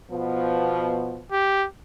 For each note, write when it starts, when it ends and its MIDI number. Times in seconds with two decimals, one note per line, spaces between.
0.11 1.20 47
0.11 1.20 53
0.11 1.20 59
1.32 1.67 67